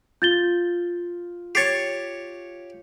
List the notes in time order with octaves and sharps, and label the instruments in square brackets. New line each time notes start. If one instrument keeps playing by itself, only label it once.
[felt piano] F4 [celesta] G6 A6 G7
[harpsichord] G4 C#5 [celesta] A6 C7